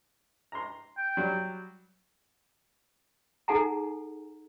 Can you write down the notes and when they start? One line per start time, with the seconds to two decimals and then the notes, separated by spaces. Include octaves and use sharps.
0.52 A#5 C6
0.97 G5
1.17 F#3 G3
3.48 D#4 G#4 A4 F#5 G#5 A#5